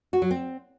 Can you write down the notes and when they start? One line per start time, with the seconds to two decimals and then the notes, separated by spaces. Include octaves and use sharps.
0.13 F#4
0.22 F#3
0.31 C4